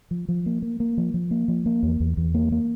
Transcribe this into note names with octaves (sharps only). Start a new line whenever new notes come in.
F3
F3
A#3
A#3
A#3
F3
F3
A#3
F3
A#3
E2
E2
E2
A#3
A#3